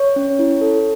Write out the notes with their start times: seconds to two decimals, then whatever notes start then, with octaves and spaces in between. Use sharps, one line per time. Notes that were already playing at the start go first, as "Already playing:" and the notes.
Already playing: C#5
0.16 C#4
0.39 E4
0.61 A4